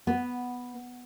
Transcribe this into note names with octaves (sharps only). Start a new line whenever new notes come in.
B3